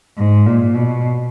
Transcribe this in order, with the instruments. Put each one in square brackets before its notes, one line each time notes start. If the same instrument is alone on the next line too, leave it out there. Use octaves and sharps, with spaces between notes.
[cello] G#2
A#2
B2